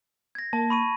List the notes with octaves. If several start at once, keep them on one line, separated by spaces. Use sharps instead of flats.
G#6 A#6
A#3 A5
B5 C#6 D#7